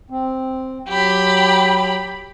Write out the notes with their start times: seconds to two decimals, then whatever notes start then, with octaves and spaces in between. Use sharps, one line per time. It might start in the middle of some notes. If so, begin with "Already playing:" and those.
0.10 C4
0.88 F#3 G4 B5